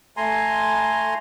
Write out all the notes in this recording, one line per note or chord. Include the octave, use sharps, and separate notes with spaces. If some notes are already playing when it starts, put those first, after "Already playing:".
A3 G#5 A#5 C6